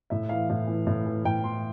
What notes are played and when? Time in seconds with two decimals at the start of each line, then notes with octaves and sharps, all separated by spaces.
0.10 A2 E5
0.29 E3 F5
0.50 A2
0.67 E3
0.87 A2
1.06 E3
1.25 A2 G5
1.44 E3 C6